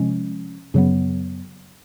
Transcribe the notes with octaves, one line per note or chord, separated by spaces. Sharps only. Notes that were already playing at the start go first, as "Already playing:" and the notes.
Already playing: C3 F3 G#3 C#4
F#2 C#3 F#3 B3